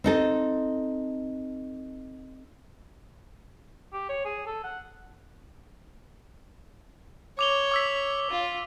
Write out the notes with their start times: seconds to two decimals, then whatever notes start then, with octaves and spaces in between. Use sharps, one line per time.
0.04 C4 D#4 A4
3.93 G4
4.09 C#5
4.25 G#4
4.46 A4
4.64 F#5
7.39 C#5 D6 F7 G7
7.72 D6 E6 B6
8.30 F4